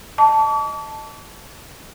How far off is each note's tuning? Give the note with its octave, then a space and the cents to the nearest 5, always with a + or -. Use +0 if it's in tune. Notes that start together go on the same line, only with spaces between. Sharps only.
D#5 -5 A5 +0 D6 -45